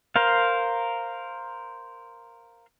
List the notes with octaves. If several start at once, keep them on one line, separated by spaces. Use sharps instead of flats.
A#4 C5 F5